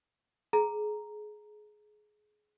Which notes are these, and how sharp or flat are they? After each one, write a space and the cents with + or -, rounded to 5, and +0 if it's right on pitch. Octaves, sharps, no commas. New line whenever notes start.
G#4 +25 A#5 +0